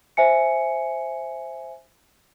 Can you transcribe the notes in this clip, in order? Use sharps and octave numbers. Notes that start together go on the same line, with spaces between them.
C5 E5 G#5 C#7